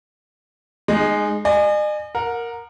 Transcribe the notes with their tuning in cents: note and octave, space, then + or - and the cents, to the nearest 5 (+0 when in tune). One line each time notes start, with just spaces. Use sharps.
G#3 +0 D#4 -25
D#5 -45 G#5 +0
A#4 +0 F#5 -30